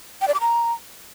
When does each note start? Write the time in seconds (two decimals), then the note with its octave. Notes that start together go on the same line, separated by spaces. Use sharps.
0.21 G5
0.28 D5
0.34 D6
0.41 A#5